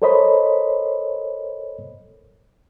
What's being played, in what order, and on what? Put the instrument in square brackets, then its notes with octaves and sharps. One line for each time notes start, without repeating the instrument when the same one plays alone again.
[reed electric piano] A4 A#4 C5 C#5 D#5 B5